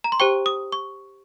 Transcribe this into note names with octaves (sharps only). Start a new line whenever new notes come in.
A#5
C6
G4 C5 G5 C#6
D#6
C#6